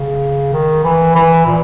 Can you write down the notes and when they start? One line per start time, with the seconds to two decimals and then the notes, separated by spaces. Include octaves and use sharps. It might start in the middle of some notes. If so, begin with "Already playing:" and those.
Already playing: C#3
0.53 D#3
0.84 E3
1.15 E3
1.46 A#2